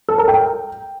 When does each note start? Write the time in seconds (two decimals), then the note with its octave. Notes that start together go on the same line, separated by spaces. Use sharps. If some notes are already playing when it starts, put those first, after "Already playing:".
0.09 A4
0.18 A#4
0.28 G5